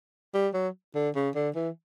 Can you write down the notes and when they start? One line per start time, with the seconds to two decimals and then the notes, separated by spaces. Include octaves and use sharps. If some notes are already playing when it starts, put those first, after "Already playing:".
0.34 G3
0.54 F#3
0.95 D3
1.15 C#3
1.35 D3
1.55 E3